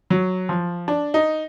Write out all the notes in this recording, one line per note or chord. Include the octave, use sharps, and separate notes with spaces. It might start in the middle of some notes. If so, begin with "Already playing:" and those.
F#3
F3
D4
D#4